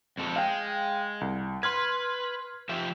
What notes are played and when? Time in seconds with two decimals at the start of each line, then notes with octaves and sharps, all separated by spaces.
0.17 F2 G#3 A4
0.36 G#3 F5 G5
1.21 C2
1.63 B4 C6 F6 G#6
2.69 F3 G4 E5